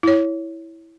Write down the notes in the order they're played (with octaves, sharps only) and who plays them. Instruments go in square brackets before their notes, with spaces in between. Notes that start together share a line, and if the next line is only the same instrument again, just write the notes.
[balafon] E4 C#5